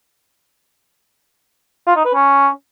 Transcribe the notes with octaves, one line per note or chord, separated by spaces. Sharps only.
F4
D#4
B4
C#4